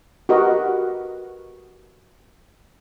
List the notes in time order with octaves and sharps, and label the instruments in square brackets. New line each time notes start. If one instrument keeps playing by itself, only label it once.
[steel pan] F#4 G4 A#4 B4 D#5